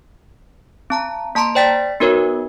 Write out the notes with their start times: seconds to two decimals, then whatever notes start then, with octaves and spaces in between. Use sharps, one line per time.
0.90 C4 A5 A#5
1.35 A#3 A5 A#5 C6 D7
1.55 C5 D5 G5 A6 B6
2.00 B3 D#4 F#4 A#4 B4 C#5